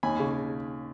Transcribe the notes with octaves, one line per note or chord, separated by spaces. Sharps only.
D#2 G#5 B5
C#3